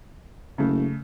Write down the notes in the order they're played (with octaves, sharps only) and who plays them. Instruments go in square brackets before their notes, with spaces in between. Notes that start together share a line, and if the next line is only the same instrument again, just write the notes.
[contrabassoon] F#1 [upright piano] C#3 A3